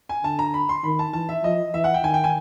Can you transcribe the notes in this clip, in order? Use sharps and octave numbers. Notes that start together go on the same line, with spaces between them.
G#5
D3 A5
A#5
B5
C6
D#3 B5
A5
E3 A5
E5
F3 D#5
E3 E5
F#5
G5
D#3 G#5
G5
G#5